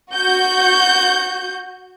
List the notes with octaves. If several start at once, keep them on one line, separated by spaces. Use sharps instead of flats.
F#4 G6